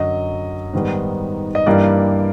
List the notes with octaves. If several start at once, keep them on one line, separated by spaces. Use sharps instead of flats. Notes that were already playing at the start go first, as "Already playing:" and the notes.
Already playing: F#2 D3 F#3 D#5
G#2 D#3 G3 B3
D#5
G2 E3 G3 A#3 D5